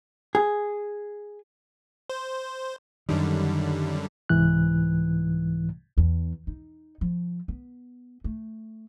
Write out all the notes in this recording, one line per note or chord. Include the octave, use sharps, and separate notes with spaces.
G#4
C5
F#2 D3 D#3 G3
C2 G#2 E3 F#6
E2
D#4
F3
B3
A3